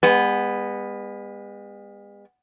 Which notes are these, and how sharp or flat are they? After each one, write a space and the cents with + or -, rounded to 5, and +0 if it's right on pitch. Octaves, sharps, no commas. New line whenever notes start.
G#3 -45 B3 +0